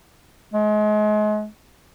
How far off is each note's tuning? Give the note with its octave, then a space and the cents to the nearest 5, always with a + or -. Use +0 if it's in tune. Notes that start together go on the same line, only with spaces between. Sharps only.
G#3 +35